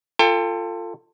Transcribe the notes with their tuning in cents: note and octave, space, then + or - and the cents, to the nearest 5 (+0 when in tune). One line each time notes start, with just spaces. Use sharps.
F4 -5 A4 +25 G5 +35